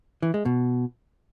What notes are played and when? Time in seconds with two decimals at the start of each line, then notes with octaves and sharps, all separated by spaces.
0.22 E3
0.34 G#3
0.45 B2